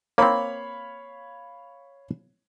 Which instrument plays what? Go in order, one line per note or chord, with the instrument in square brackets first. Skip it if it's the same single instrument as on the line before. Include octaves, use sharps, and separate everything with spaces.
[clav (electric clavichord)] A#3 C4 [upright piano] C#5 F5 B5